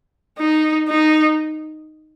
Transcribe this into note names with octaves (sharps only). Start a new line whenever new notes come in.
D#4
D#4